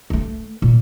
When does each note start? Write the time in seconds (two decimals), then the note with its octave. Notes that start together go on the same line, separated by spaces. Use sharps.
0.10 G#3 A3
0.62 A#2